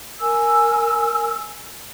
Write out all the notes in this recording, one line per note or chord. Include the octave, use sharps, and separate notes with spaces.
A#4 G#5 E6